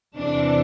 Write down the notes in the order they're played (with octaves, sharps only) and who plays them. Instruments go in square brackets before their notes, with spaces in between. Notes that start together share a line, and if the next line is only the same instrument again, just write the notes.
[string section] E2 C3 E3 D4